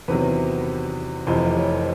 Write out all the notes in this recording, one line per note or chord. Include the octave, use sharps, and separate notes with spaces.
E2 C3 D#3 F#3 B4
F1 F2 C3 E3 C5
C#5